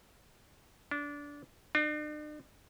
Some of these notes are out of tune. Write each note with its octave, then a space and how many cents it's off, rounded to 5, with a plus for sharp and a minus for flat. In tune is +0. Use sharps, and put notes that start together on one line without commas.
D4 -20
D4 +45